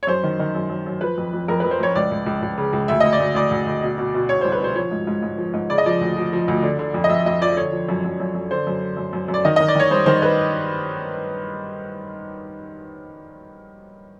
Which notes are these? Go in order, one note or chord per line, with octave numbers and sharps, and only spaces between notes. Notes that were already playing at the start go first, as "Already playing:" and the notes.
C#5
F#2 C5
D#3
D#3
F#2
F#2
F#2
F3 B4
F2
F2
F2 A#4
F2 B4
C5
F2 C#5
C#2 D5
C#2
C#2
C#2
C#3
C#2
D2 E5
D2 D#5
D5
D2
D2 D5
D2
D2
B2
B2
B2
B2 C#5
C2 C5
B4
B2 C5
F3 C#5
G#2
G#2
G#2
F3
G#2
C#3 D5
D#5
F3 D5
D2
F3
F3
D2
D3
D3
F2
D#5
F2 E5
F2 D#5
F3 D5
D3 C#5
F3
F#2
F#2
F#2
F#2
D3 C5
F#2
D3
F#2
F#2
F#2
D5
D#3 D#5
D#3 D#5
D5
D#3 C#5
G2 C5
D#3 C5
B4